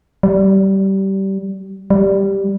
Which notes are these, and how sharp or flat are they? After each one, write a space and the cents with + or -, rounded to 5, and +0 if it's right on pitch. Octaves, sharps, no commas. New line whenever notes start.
G3 -20
G3 +0